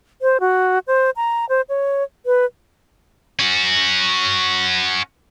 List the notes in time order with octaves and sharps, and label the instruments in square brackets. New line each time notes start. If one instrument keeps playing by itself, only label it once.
[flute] C5
F#4
C5
A#5
C5
C#5
B4
[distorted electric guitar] C#4 F#4